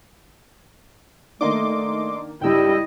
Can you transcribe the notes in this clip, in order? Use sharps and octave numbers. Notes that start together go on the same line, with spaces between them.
D#3 A3 A#3 D4 D#5 C6 D6
C#2 G2 G3 E4 D#5 G5 E6